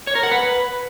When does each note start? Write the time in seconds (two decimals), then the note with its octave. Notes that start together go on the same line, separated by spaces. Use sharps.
0.07 C#5
0.15 A#4
0.23 F#5
0.31 B4